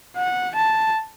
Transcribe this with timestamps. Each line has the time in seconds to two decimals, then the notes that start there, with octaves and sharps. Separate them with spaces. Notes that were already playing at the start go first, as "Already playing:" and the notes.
0.17 F#5
0.56 A5